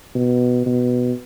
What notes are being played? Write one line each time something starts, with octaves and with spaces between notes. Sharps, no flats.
B2
B2